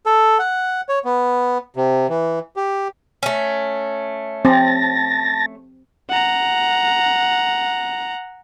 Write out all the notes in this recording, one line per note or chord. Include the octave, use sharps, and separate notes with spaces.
A4
F#5
C#5
B3
C3
E3
G4
A3 C#4
C4 A5 A6 A#6
F#5 A#5